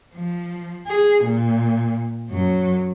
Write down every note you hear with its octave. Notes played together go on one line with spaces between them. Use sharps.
F3
G#4
A#2
F#2 F#3